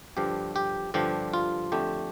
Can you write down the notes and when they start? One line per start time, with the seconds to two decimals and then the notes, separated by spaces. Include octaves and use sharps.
0.17 G2 D3 F3 G4
0.56 G4
0.94 G2 D3 F3 G4
1.34 F4
1.72 F2 D3 A3 G4